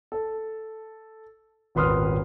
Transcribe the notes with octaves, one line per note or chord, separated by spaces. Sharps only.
A4
D#1 G#1 B4 C6 D#6 F6